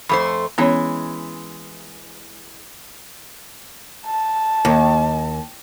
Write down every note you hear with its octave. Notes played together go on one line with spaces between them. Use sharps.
F2 A3 C5 B5
E3 G#3 B3 C#4 C#5
A5
D#2